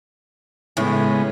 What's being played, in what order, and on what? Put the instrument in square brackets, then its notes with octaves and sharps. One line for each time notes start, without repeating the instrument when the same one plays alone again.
[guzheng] A2 [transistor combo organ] C#3 G#3 B3